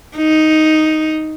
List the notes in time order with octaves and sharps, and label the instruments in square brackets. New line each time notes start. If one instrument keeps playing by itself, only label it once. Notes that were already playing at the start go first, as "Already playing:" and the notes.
[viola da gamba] D#4